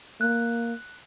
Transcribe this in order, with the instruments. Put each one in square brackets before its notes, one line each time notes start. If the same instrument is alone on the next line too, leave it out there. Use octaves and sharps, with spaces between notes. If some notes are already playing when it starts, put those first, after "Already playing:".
[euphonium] A#3 [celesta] F#6